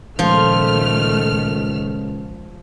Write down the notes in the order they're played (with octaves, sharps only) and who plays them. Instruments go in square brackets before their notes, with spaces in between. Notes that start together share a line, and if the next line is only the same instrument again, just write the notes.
[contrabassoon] C#2 [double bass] A#2 D#3 [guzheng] F3 [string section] A3 F6